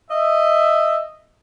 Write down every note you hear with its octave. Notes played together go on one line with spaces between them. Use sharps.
D#5 E5